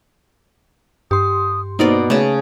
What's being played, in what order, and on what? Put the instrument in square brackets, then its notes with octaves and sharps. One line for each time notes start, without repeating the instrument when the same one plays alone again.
[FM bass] G2 [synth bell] G4 C6 [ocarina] D#6
[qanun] B2 A#4 D5 [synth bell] A#3 D#4 [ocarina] C5
[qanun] C#3 A5 [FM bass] A3 [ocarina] C#5